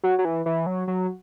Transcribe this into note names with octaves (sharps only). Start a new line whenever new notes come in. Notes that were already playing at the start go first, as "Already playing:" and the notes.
F#3
F#3
E3
E3
F#3
F#3